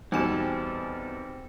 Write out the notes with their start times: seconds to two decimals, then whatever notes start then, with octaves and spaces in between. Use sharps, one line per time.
0.12 E2 B2 G3 C4 D#4 A4 G#5 E7